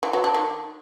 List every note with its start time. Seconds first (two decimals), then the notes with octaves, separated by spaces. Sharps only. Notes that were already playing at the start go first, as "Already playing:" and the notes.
0.03 E3
0.13 F#3
0.24 D4
0.34 D#3